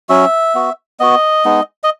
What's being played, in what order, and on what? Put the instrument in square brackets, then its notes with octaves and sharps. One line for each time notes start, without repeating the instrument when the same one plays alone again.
[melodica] F#3 C#4 F#4 E5
B3 F#4
B3 F#4 D#5
G#3 B3 D#4
D#5